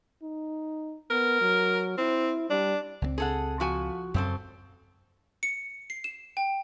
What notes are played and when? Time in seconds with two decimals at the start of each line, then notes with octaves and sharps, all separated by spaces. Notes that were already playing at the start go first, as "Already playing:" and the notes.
0.23 D#4
1.10 B3 A#4
1.41 F#3
1.98 C4 E4
2.50 G3 D4
3.02 C#2 A3 C4
3.18 G#4 A4 F#5
3.60 F3 F#4 G#5
4.14 F#2 C#3 C4 A4
5.43 C#7
5.90 C7
6.04 E7
6.37 G5